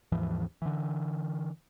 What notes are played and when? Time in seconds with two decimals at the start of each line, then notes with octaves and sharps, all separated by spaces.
0.12 D#2 G#2 E3 F3
0.62 D3 E3